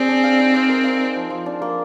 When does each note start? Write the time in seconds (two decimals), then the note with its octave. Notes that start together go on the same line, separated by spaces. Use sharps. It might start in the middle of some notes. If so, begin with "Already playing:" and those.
Already playing: C4 G#4 D5
0.09 D4
0.24 F5
0.39 D#4
0.54 D5
0.69 A#4
0.84 F5
1.00 D#4
1.16 F3
1.30 F3
1.46 D4
1.62 A#3